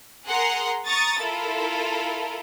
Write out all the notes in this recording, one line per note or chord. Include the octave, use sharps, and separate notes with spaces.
G#4 A#4 F#5 A#5 C6
A#5 C#6 D#6 A6
E4 F4 A4 A#4